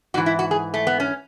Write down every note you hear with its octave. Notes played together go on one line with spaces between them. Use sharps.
G#2 E3 F#4
E4
F#4
G#4
A3
B3
C#4